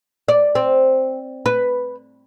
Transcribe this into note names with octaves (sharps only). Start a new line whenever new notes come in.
D5
C4
B4